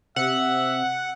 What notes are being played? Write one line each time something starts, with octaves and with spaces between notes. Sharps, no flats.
C3 E5 F#5